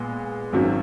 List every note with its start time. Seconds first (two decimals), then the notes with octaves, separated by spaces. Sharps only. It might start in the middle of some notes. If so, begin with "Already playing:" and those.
Already playing: A#2 G#3 B3
0.53 G#1 F#2 D#3 F#3